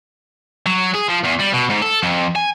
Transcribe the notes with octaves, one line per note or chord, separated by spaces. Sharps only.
F#3
G#4
F3
E2
G3
B2
G#2
A4
F2
G#5